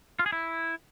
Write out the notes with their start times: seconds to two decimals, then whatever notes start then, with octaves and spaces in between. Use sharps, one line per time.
0.19 F4
0.26 G#4
0.32 E4